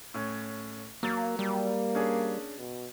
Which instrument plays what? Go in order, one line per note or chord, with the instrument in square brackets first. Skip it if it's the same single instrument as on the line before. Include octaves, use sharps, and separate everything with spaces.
[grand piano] A2 C#4
[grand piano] F#3 A6 [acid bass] A#3
[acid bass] G3 [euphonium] A#3
[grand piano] C#4 D4 G#4
[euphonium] B2